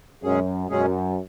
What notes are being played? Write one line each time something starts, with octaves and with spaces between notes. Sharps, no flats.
F#2 B2 G#3 C#4 G#4
F#2 B2 G#3 C#4 G#4